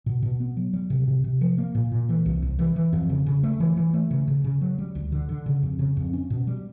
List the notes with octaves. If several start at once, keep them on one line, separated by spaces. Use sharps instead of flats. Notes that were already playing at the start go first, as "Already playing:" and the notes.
B2
B2
B3
F#3
G3
C3
C3
C3
F3
A#3
A#2
A#2
E3
C2
C2
E3
E3
F2
C#3
C#3
A3
E3
E3
A3
C#3
C#3
C#3
F#3
G3
D2
D3
D3
C#3
F2
C#3
F2
C#4
B2
G3